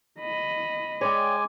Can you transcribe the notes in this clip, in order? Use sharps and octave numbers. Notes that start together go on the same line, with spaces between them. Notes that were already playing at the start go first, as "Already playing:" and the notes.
D#5 B5
G#3 C#5 D5 G5 G#5 D6